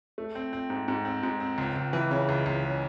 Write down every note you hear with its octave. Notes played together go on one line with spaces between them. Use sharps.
A3
C4
C4
G#2
G#2
C4
G#2
C4
C#2
C#2
E3
C#3
C#2
C#2
C#3